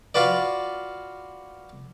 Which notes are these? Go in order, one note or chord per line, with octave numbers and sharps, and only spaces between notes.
F4 F#4 B4 D5